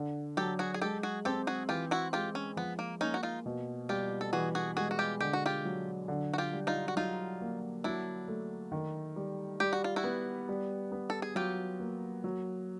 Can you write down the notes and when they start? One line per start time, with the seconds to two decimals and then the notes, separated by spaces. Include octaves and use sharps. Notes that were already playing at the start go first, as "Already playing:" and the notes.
Already playing: D3
0.37 F#3 G4 A4
0.59 F#4 G#4
0.74 G#4
0.81 G#3 G4 A4
1.03 F#4 G#4
1.25 C4 G4 A4
1.47 F#4 G#4
1.69 E3 F4 G4
1.91 E4 F#4
2.13 G#3 F4 G4
2.35 C#4
2.57 F3 B3
2.79 A#3
3.01 A#3 C#4 D#4
3.14 F#4
3.23 D#4 F4
3.46 B2
3.89 G3 F4 G4
4.21 A4
4.33 E3 F#4 G#4
4.55 F#4 G#4
4.77 G#3 F#4 G#4
4.91 F#4
4.99 F4 G4
5.20 D3 G4
5.33 F#4
5.46 F4 G4
5.65 F#3
6.08 D3
6.34 F#4
6.38 F4 G4
6.53 G3
6.67 D#4 F4
6.88 F#4
6.96 F#3 D#4 F4
7.41 A#3
7.84 F#3 D4 E4
8.28 A3
8.72 D#3
9.16 G3
9.60 G3 G4
9.73 F#4
9.84 F4
9.96 E4 F#4
10.04 B3
10.49 G3
10.92 B3
11.10 A4
11.22 G#4
11.35 F#3 F4 G4
11.80 A#3
12.24 F#3